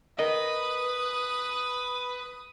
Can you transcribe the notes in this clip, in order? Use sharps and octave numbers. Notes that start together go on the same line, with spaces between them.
A#4 B4 D#5 D#6